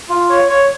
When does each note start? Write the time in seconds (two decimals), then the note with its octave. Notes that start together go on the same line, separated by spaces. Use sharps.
0.09 F4
0.29 C#5
0.49 C#5